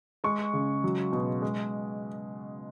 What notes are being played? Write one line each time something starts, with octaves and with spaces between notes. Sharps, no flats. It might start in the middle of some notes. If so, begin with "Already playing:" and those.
G#3 C#6
C#3
F#3
B2
G#3